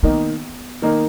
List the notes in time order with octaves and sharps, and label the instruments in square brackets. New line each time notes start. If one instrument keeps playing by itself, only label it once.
[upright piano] D#3 A#3 D#4 [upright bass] B3
[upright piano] D#3 A#3 D#4